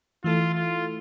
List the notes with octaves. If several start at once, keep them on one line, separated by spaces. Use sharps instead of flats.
E3 A3 E4 F4 A4
F4